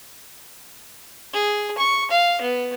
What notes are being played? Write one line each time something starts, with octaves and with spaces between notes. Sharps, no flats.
G#4
C#6
F5
B3